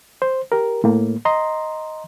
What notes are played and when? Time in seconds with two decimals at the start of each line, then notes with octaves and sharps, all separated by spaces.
0.22 C5
0.52 G4 A#4
0.84 A2 A#3
1.25 D#5 A#5 C6